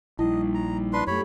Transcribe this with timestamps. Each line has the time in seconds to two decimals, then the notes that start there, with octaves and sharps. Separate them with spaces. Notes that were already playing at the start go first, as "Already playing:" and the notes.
0.19 A#1 G3 D#4 E4 D#5
0.54 A#5
0.93 D4 B4 C6
1.07 F#2 A3 G4 A4 C#5 B5